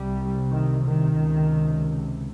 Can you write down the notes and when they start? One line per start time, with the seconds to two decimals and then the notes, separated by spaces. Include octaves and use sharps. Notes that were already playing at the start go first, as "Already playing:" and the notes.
Already playing: C2 C3 G3
0.50 D#3
0.85 D#3
1.18 C#2 C3